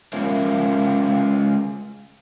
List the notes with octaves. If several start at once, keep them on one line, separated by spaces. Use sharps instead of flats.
G#3 C#4 F4 A#4 E5